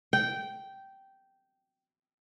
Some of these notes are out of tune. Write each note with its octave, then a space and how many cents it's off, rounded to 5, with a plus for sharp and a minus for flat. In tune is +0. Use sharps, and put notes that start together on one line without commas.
G5 -10